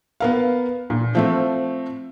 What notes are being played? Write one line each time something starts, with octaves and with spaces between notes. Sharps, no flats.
B3 A#4 F5
A#2
F3 A3 C4